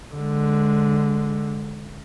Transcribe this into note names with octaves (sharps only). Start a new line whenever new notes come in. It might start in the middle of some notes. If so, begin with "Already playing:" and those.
D3 G#3